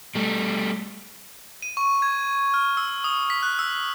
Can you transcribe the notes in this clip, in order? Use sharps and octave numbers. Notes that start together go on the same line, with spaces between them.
G3 A3
D#7
C#6
G#6
F6
E6
D#6
B6
F#6
E6